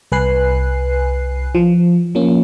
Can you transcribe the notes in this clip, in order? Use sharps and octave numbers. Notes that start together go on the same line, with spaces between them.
C2 B4 G#5 F#6 C7
F3
F3 A#3 C#4